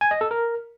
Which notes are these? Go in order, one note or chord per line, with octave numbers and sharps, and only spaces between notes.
G#5
D#5
A4
A#4